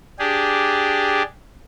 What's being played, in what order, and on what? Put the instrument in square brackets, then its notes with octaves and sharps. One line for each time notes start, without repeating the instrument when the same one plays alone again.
[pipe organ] D4 G4 G#4